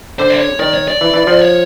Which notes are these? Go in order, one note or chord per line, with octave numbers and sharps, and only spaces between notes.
D3 C5
D5
C#5
D#3 D5
C#5
D5
E3
E3
F3
C#5